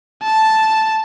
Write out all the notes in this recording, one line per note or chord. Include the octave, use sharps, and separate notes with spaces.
A5